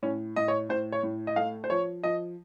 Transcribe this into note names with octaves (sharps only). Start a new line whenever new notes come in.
A2 C#4
A2 D#5
C#5
A2 C5
C#5
A2
D#5
A3 F5
C5
F3 C#5
F3 D#5